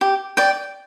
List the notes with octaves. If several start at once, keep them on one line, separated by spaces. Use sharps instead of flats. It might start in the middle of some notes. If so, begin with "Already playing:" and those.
G4
D5 G5